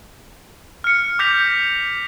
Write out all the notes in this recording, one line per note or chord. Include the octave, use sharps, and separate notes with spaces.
F6 C#7
D6 F6 G6 A#6 B6 F7